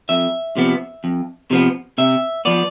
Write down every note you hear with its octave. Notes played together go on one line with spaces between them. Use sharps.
F2 E5
C3 F3 B3
F2
C3 F3 B3
C3 E5
F3 B3 D5